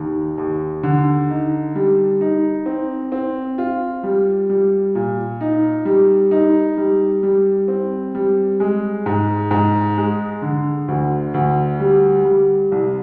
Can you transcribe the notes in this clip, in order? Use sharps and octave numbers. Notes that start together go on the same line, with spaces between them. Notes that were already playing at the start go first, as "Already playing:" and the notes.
Already playing: D#2 D#4
D#2
D3
D#4
G3
D#4
C4
C4
F4
G3
G3
A#2
D#4
G3
D#4
G3
G3
C4
G3
G#3
G#2
G#2
G#3
D3
D2
D2
G3
G3
C2